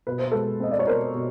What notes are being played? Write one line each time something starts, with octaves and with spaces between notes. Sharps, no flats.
B2 B4
C5
G#3 A4 B4
C4 D#5
D5
C#5
B2 A#4 C5
B2